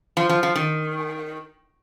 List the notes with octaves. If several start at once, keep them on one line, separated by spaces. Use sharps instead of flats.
F3
F3
F3
D#3